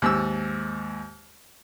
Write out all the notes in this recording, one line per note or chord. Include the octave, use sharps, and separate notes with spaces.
D#2 G#2 E6